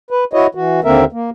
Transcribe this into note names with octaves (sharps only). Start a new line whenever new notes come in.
B4
E4 F#4 C#5 D#5
E3 F#4
D#2 D3 A#3 C4 A#4 E5
A#3